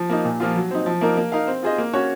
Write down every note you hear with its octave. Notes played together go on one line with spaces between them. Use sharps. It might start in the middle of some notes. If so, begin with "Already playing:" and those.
Already playing: F3
A#3 D#4
A#2
F3 A#3 F4
F#3
C4 D#4
F3
A#3 D#4 A#4
A#3
D#4 A#4 F5
C4
F4 G#4 C5 D#5
A#3
C#4 F#4 C#5